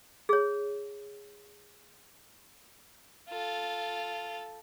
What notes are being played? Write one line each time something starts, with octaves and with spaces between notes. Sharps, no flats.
G#4 C#5
F4 A4